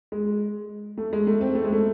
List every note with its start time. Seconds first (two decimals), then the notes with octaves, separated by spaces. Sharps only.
0.12 G#3
0.98 A3
1.13 G#3
1.27 A3
1.41 C4
1.55 A3
1.64 G#3
1.72 A3